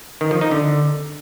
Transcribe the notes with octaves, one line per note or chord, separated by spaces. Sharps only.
D#3
F3
D#4
D3